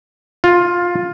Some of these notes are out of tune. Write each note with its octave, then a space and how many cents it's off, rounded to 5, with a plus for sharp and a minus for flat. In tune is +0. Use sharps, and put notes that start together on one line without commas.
F4 +10